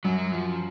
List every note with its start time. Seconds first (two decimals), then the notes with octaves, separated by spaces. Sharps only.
0.04 F#2 F#3
0.33 F3